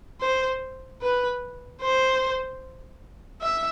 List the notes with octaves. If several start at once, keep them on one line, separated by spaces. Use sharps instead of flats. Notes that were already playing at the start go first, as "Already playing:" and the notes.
C5
B4
C5
E5